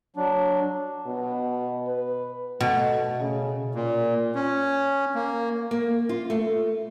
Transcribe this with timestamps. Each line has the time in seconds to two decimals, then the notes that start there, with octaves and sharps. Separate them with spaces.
0.16 F#3 D4
1.06 B2
1.87 B4
2.61 B2 A3
3.20 C#3
3.74 A#2
4.35 C#4
5.15 A#3
5.71 A#3
6.09 F4
6.30 A3